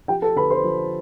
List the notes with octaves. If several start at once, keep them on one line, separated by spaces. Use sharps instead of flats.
F3 G4 G5
A4 A5
D3 B4 B5
C5 C6
F3